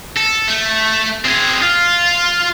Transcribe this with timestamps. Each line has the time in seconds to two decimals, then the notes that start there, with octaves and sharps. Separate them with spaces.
0.16 A4
0.48 A3
1.25 C4 G#4
1.62 F4